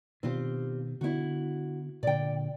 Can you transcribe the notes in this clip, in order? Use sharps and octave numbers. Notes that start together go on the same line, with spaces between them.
B2 D#3 C4 F4 G4
D3 B3 E4 F#4
A#2 D3 D5 G5